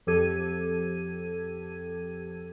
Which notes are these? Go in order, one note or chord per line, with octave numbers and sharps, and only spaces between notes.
F2 F3 G4 A4 G#6 D#7